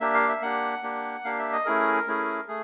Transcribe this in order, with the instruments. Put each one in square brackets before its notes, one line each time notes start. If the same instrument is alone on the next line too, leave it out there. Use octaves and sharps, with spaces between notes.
[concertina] A#3 D4 G4 E5
F5
E5
A#3 D4 G4 F#5
A#3 D4 G4
A#3 D4 G4 F5
E5
D#5
A3 C#4 E4 G#4 A#4
A3 C#4 E4 G#4
A3 G#4